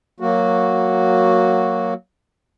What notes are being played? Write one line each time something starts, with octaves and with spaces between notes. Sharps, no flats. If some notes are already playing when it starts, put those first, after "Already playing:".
F#3 A#3 F#4